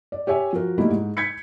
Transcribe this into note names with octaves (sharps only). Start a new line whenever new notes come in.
D5
G4 C#5 E5 G#5
F3 F#4 A#4
G3 A3 A#3 D#4 E4
G#2
G6 G#6 B6 C#7